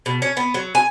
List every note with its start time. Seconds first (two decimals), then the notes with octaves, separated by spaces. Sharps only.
0.06 B2
0.22 C#4
0.37 B3
0.54 F#3
0.75 G#5